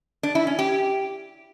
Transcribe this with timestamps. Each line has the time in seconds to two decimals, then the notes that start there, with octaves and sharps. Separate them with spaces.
0.23 D4
0.35 E4
0.47 C#4
0.59 G4